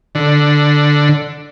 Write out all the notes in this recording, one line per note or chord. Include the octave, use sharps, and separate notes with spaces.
D3